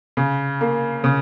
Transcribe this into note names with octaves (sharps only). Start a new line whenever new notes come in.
C#3
A#3
C#3